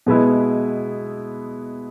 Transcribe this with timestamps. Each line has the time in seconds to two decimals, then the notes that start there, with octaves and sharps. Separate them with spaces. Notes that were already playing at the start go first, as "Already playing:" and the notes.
0.06 B2 G#3 B3 E4